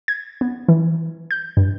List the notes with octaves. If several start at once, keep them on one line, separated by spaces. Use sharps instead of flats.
G#6
B3
E3
G6
G2